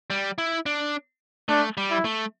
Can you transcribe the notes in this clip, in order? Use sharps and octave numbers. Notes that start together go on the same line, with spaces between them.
G3
E4
D4
A3 D4
G3
E4
A3